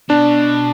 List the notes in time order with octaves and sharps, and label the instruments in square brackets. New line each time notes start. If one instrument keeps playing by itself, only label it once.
[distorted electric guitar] B2 [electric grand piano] D4